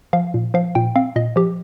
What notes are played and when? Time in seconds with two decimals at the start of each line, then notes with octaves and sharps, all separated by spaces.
0.13 F3 F5
0.34 A#2
0.54 F3 F5
0.75 A#2 G5
0.96 C4 F5
1.16 A#2 D#5
1.36 F3 G4